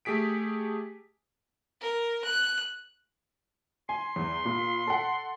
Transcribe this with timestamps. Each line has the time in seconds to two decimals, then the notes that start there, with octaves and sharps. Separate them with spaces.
0.05 A3 G4 G#4 B6 D7
1.81 A#4
2.24 F#6
3.89 G#5 C6
4.16 E2
4.45 A#2
4.87 A4 F#5